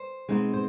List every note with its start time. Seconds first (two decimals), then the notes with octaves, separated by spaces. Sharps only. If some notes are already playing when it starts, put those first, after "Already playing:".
Already playing: C5
0.29 B2 G#3 C4 D#4
0.54 C5